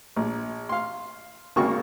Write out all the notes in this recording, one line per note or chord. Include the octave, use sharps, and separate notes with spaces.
A#1
F5 C6
G#1 C#3 A#3 F#4 C#6